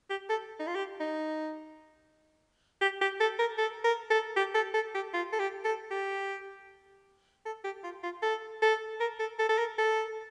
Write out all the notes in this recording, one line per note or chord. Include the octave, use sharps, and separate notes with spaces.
G4
A4
D#4
F4
G4
D#4
G4
G4
A4
A#4
A4
A#4
A4
G4
A4
A4
G4
F4
A4
G4
A4
G4
A4
G4
F4
F4
A4
A4
A#4
A4
A4
A4
A#4
A4